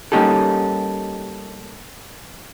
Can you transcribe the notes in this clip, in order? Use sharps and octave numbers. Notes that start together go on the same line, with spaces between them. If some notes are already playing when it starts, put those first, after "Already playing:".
G3 A#3 C#4 D#4 G4 A4